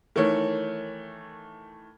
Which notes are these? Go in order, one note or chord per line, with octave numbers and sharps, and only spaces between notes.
D#3 E3 A3 A#4 C#5